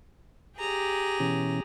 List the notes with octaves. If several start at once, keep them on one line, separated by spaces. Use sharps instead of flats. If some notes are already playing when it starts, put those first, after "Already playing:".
G4 G#4 A#5
B2 E3 C#4